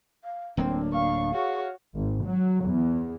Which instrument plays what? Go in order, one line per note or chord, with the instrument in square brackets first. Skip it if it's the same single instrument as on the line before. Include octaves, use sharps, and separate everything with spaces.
[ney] F5
[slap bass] D1 F#3 A#3 [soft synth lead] C4 [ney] D4
[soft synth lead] F5 [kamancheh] C#6
[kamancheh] F#4 C#5 [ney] G#4
[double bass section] G#1
F#3
E2